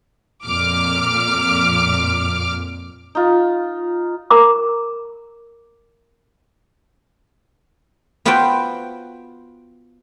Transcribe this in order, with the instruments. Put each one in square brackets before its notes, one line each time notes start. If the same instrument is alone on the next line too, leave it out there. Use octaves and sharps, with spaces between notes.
[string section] F2 A#2 D6 F6
[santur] D#4 F4
[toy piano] A#4 A#5 D6
[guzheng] B3 F4 F#4 B4 C5 G5